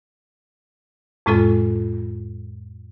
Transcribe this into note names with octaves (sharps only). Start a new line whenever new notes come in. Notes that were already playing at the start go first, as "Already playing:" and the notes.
F2 A2 G#3 C4 F4 A4